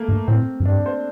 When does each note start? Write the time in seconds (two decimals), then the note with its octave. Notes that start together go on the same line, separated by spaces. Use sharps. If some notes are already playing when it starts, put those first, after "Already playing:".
Already playing: A3 A#3
0.08 G2
0.28 A2 C4
0.60 F#2
0.65 G2 D4
0.86 C5